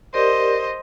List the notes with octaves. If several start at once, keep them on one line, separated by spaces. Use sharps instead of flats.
G4 A#4 C5 D5 D#5